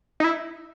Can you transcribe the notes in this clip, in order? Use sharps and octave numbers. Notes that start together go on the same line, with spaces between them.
D#4
E4